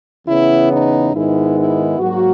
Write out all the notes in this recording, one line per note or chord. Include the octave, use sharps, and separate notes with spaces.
E2 C#3 E3 B3 E4
D#4
G#2 D#3 G#3 B3 E4
E4
G#2 F#3 A#3 F#4